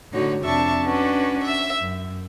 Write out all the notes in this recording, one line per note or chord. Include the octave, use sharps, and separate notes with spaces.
A2 D3 D#4 F#4 C#5
F2 C3 D4 E5 A5 C#6
C#4 D4 F#4 B4
E5 E6
F#2